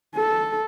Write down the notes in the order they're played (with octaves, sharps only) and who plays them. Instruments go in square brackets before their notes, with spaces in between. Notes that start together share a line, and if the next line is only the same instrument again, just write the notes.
[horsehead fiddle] A4